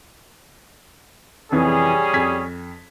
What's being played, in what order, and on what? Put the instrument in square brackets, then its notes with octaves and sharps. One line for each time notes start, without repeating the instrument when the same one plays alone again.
[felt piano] F2 C3 E3 [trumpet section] G3 C#4 G#4
[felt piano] F2 G#6 B6